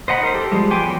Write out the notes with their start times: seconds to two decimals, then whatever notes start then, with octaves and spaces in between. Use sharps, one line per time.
0.08 C5 D#5 F#5 A#5 B5
0.21 D#4 A#4 C5
0.34 G4 A4
0.52 F3 G3 G#3
0.71 B3 G5 G#5 C6 D6
0.86 E3 F#3 F#4 G5